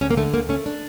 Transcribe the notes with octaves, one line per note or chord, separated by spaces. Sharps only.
D2 C#4
A#3
D3 A3
D2 A#3
A3 C#4
D4